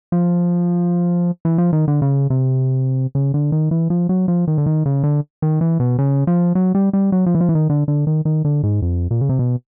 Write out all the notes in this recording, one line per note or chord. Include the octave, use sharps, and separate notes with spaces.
F3
E3
F3
D#3
D3
C#3
C3
C#3
D3
D#3
E3
F3
F#3
F3
D#3
D3
D#3
C#3
D3
D#3
E3
B2
C#3
F3
F#3
G3
G3
F#3
F3
E3
F3
E3
D#3
D3
D3
D#3
D#3
D3
G#2
F2
A#2
C#3
C3
B2